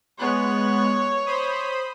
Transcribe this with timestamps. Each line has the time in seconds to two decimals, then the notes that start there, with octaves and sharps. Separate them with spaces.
0.19 G#3 B3 C#5 F#6
1.26 C5 B5 D#6